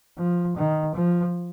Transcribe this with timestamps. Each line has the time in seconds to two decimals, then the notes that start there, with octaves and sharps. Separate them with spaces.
0.18 F3
0.56 D#3
0.95 F3